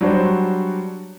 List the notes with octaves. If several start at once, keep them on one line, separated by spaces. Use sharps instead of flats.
F#3 G3 D4 F#4 C5